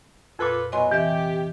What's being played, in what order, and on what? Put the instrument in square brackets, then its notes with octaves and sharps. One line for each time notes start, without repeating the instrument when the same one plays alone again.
[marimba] F2 A#2 [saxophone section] F4 A4 B4
[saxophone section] B2 F#3 [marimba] D#5 G#5 C6
[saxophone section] C3 G4 [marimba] E3 E5